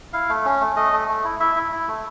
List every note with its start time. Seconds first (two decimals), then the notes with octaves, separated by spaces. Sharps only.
0.13 E4 F5
0.29 A3
0.45 C#4
0.61 A3
0.76 A3 D#5
0.93 A3
1.08 A3
1.25 E4
1.40 E4 E5
1.56 E4
1.72 E4
1.88 A3